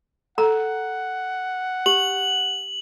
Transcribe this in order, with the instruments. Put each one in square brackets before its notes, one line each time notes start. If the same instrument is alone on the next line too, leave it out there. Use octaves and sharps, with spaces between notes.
[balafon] A4 [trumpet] F#5 [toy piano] A#5
[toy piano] G4 [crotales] F#7